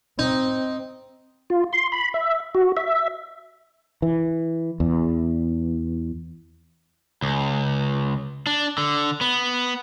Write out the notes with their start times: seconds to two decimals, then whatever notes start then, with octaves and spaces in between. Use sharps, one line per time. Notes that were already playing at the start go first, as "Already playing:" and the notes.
0.19 C4 D#4
1.50 F4
1.73 C6
1.92 B5
2.14 E5
2.55 F#4
2.77 E5
4.02 E3
4.80 E2
7.22 C#2
8.47 D4
8.78 D3
9.21 B3